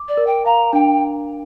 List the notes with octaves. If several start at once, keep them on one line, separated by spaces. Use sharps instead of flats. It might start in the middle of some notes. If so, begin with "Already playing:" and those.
Already playing: D6
D5
A#4
G5
F5 A#5
D4 G5